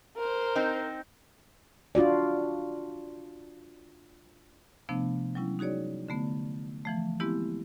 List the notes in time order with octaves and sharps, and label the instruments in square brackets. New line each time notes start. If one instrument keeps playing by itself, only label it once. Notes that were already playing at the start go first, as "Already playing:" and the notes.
[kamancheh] A#4 C5
[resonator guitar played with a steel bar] C4 D#4
[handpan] D4 F4 F#4 D5
[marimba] C3 F3 A3 B3 D4
F#3 G3 C#4 E4
D#4 F#4 G#4 C#5 D5
D3 A3 B3
E3 F3 A3
G#3 B3 C4 E4 G4